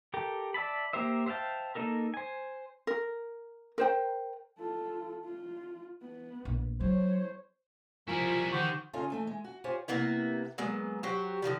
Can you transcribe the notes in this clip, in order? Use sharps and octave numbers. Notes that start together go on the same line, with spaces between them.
G4 A4 A#4 G5
D5 E5 A5 B5
A#3 G4 A#4 C5 E5
C5 E5 F5 G5 A5
A#3 D#4 A4 A#4
C5 G#5
A#4
A#4 C5 G5
F4 A4
F4
B3
A#1
F#3 C5 C#5
F3 G3 E4 F4 A#4 G#5 C#6
D#3 F#4 G4 C5 C#6
C#3 C#4 D#4 F4 G#4 A4
E3 A3 D#4
G#3
F#4
F4 G4 G#4 C5 C#5
C3 A#3 B3 E4
F#3 G#3 A#3 B3
F#3 F#4 G4 C5
D3 D#3 F3 G3